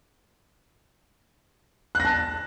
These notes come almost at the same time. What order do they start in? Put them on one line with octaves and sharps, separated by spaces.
F#6 A#6 A5